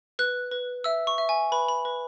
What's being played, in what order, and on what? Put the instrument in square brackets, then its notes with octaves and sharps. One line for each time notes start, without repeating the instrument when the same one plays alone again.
[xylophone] B4 F#6
B4
E5 E6
C#6
E5
G#5
B4 B5
B5
B4